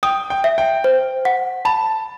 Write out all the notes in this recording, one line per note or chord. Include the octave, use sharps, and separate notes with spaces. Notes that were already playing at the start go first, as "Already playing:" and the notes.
G5 D#6
G5
E5
G5
C5
F#5
A5 B5